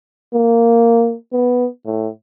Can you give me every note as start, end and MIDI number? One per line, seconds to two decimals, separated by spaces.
0.33 1.15 58
1.33 1.67 59
1.85 2.08 45